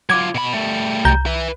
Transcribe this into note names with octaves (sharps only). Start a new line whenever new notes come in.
F#3 F4 D6 G#6
B2 B5
G3 A3
C2 A#5 G6
B4 E5